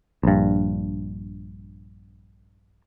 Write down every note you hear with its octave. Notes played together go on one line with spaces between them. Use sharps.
A#1 G2